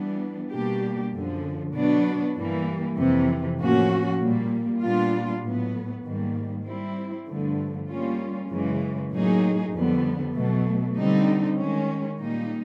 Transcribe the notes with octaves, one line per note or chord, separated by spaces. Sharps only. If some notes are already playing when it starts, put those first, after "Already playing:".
Already playing: E3 G3 B3 D4
B2 G3 A#3 D4 G4
F#2 D3 F3
B2 F#3 B3 D4
G2 E3 G3 A#3
F2 C3 E3
A2 F3 A#3 C#4 F#4
A#2 G3 A#3
A#2 G3 B3 D4 F4
A2 F#3 B3
G#2 D#3 G3 A#3
G3 C4 E4
G2 D3 F3 A3
G3 A#3 C#4 F4
F#2 C#3 E3 G#3
A2 F#3 A#3 D#4 G#4
F2 D3 G3 B3
B2 F#3 A3
D3 G3 C4 D#4
D#3 G#3 C#4
A#2 G3 A#3 D#4